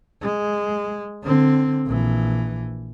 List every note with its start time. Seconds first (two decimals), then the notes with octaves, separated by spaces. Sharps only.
0.22 G#3
1.23 D3 C4
1.86 A#1 E3